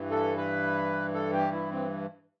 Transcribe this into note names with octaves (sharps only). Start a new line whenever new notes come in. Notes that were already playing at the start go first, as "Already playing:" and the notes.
Already playing: G2 E3
A4
B4
A4
G4
E4
C4